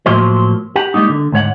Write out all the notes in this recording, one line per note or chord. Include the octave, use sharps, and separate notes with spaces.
A2 F3 F#3 A#3 C5
G4 F#5
G3 G#3 A#3 D#4
D3
D2 G#2 C#5 F#5